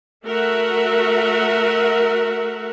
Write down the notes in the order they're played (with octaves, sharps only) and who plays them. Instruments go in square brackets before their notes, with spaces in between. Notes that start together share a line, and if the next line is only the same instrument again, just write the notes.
[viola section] A3 F#4 A#4 E5 F#5